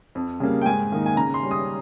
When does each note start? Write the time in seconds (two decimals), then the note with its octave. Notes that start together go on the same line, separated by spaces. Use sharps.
0.15 F2
0.40 C#3 G3 A#3
0.62 G5
0.66 G#2 G#5
0.92 D#3 A#3 D#4
1.06 G#5
1.16 C#3 A#5
1.34 C6
1.43 G3 C#4
1.51 D#6